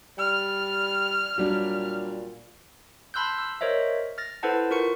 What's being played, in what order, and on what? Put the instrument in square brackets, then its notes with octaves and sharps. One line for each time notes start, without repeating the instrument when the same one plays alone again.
[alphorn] G3 [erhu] F6
[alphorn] A#2 [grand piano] F#3 G3 D4
[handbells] A5 B5 C6 E6 F#6 G6
E6
A#4 C5 C#5 D#5 E5
F6 A6 A#6
E4 A4 B4 C5 F#5 A5
F4 A#4 C#6 C#7